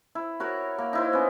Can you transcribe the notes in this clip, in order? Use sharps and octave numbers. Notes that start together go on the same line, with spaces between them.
E4
F#4 A#4 C#5
A#3
D#4 E4 C5
B3 C#4